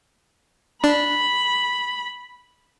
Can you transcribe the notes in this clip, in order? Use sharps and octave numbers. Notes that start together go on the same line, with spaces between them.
D4 B5